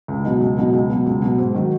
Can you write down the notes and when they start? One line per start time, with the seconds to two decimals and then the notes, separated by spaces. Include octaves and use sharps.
0.08 C#2
0.25 B2 F#3 D#4
0.41 C#2
0.57 B2 F#3 D#4
0.73 C#2
0.89 B2 F#3
1.06 C#2
1.21 B2 F#3
1.38 G#2
1.54 D#3 F#3